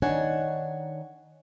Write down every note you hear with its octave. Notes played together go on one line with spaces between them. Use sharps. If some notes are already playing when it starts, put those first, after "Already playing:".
D#3 D4 D#4 C#5 F#5 G#5